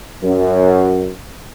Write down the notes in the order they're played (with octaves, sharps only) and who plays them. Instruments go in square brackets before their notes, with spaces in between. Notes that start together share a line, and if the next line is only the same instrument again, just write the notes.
[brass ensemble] F#2